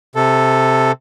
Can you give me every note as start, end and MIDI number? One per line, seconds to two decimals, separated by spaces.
0.15 0.92 48
0.15 0.92 69